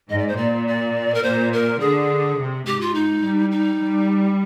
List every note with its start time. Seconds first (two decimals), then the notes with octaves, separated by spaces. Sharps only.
0.09 G#2 D#5
0.18 D5
0.28 C5
0.37 A#2 D5
0.67 D5
1.14 A#4
1.23 A#2 C5
1.53 A#4
1.80 D3 G#4
2.38 C3
2.66 G#2 G4
2.81 F4
2.94 D#4
3.23 G3
3.51 D#4
3.80 G3